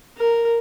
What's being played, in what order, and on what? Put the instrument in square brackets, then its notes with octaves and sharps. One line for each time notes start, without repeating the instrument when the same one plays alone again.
[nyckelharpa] A#4